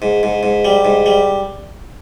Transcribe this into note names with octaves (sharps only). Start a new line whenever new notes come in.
G#2
G#2
G#2
G3
G#2
G3